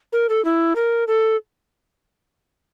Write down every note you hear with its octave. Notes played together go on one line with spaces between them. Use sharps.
A#4
A4
E4
A#4
A4